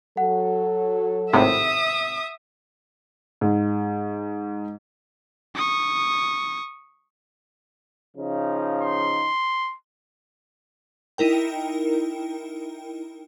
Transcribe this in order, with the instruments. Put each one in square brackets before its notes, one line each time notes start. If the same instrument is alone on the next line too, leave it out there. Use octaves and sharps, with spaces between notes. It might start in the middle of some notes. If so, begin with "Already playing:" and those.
[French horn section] F#3 A4 [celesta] F#5
[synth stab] G#1 A2 C3 [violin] E5 D#6
[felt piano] G#2
[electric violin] C#6 D#6
[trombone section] C#3 F3 D#4
[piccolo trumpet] C6
[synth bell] D#4 E4 A#4 G5